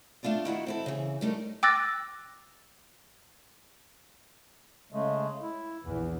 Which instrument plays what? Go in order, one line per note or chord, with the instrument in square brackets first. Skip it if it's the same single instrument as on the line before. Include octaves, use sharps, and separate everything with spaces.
[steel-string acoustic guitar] A3 D4 F4 A4 D5
D#3 E4 F#4 F#5
C4 E4 A4
C#3 E3
G3 A3 D#4 A#4
[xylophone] G5 D6 E6 F#6 A6 A#6
[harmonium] C#3 G#3 A3
E4
[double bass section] A#1 E2 [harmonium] E3